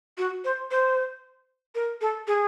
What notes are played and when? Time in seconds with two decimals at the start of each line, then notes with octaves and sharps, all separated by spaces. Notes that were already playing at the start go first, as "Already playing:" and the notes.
0.18 F#4
0.44 C5
0.71 C5
1.75 A#4
2.01 A4
2.27 G#4